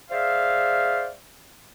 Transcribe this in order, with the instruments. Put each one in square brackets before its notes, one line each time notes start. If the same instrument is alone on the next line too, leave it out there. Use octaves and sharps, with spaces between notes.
[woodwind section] G#4 C5 D5 E5 F5